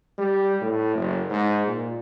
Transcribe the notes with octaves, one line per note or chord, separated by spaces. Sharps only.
G3
A2
F#1
G#2
A#2